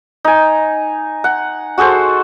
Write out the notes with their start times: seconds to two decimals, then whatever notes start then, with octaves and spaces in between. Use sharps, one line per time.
0.25 D#4 G#5
1.24 F#5
1.78 F#4 G#4 A4 C5